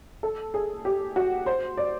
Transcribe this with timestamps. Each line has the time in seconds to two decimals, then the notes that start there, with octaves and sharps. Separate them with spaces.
0.23 A4
0.54 G#4
0.85 G4
1.16 F#4
1.46 C5
1.77 D5